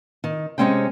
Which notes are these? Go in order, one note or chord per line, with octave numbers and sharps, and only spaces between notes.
D#3
C3 F#3 G#3 C#4 C5 G5